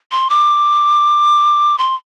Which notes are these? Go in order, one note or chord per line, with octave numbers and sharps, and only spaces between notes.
C6
D6
C6